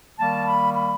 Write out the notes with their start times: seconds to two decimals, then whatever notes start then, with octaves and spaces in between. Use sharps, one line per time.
0.18 D#3 G3 A#3 A5
0.47 B5
0.74 B5